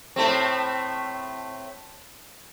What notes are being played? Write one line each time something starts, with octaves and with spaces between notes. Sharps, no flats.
A2 A3 C4